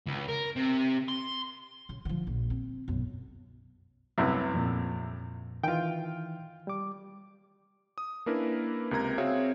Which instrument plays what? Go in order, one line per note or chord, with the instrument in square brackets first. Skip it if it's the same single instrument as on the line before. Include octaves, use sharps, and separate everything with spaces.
[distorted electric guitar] C#2
A#4
C3
C6
[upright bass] C#3
D3 F3
A#1
C4
B1 F#2
[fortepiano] C2 A2 C3 [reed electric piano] F#2 B4
[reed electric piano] F2 A#2
[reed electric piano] D#3 E3 [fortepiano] F4 G5
[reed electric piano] G3 D6
[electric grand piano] D#6
A#3 C#4 D4 E4 A#4 B4
C#2 C3 A#4 A#5 G#6
C4 F#4 G#4 C#5 E5 F5